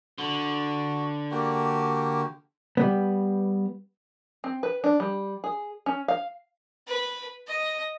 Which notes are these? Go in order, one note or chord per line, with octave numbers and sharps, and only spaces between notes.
D3 F#4
A#3 F#4 G4
G3 B3
C4
B4
D4
G3
G#4
C#4
F5
B4
D#5